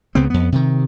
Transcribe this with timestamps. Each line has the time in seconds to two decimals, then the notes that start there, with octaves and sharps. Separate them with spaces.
0.15 C#2 C#3 B3 C4
0.30 F2 B3
0.52 C3 D#3